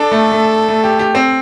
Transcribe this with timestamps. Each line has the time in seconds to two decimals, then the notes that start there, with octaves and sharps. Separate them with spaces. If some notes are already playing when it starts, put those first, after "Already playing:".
Already playing: D4 A4
0.12 A3
0.32 A3
0.69 A3
0.84 G4
0.99 G4
1.15 C4